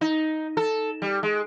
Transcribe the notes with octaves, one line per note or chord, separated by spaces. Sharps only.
D#4
A4
G3
G#3